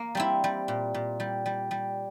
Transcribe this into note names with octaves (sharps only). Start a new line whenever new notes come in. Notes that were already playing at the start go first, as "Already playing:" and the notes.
Already playing: A#3
G3 C4 E4
G3
A#2
A#2
G3
G3
G3